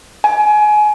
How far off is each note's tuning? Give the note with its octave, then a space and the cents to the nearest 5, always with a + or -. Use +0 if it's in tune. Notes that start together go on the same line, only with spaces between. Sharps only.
G#5 +25